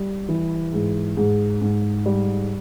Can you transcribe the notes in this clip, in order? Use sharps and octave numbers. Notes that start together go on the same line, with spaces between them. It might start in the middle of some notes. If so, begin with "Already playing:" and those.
Already playing: G3
E3
G#2
G#2
G#2
G3